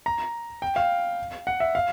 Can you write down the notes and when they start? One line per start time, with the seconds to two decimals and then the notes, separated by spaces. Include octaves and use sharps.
0.06 A#5
0.62 G5
0.76 F5
1.47 F#5
1.60 E5
1.75 F5